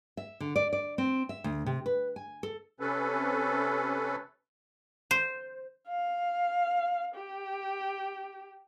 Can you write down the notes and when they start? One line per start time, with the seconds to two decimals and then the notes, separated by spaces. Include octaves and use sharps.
0.17 E5
0.40 D3
0.56 D5
0.73 D5
0.98 C4
1.29 E5
1.44 D2
1.66 C3
1.86 B4
2.16 G#5
2.43 A4
2.80 C3 C#4 A4 B4
5.11 C5
5.88 F5
7.16 G4